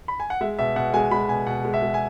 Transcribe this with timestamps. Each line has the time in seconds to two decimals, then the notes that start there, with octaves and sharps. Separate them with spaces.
0.08 B5
0.20 G#5
0.30 F#5
0.41 G#3 E5
0.59 B2 E5
0.76 B2 F#5
0.94 G#3 G#5
1.11 G#3 B5
1.29 B2 G#5
1.47 B2 F#5
1.65 G#3
1.74 E5
1.82 G#3
1.94 G#5